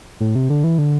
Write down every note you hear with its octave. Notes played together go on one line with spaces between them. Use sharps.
A2
C3
D3
E3
D3